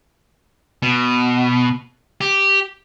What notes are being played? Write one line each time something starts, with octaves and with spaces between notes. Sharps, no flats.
B2
G4